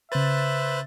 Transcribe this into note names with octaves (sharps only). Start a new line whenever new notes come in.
C#3 B4 C5 E5 F#6 A6